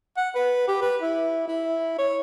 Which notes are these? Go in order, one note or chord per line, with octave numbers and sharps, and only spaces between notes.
F#5
B4
G4
B4
E4
E4
C#5